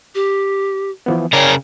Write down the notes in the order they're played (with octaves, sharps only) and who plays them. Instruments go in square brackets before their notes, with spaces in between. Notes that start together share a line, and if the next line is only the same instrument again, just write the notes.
[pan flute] G4
[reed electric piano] E3 F3 B3
[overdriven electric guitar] C#3 A#4 [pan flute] C#5 [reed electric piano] D5 G5